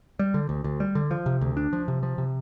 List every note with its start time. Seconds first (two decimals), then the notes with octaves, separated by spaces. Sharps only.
0.19 G3
0.34 D3
0.49 D2
0.64 D2
0.80 G3
0.95 D3
1.11 F3
1.26 C3
1.41 D2
1.57 D4
1.73 F3
1.88 C3
2.03 F3
2.18 C3